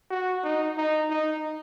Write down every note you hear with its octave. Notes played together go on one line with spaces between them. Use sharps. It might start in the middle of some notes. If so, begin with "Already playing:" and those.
F#4
D#4
D#4
D#4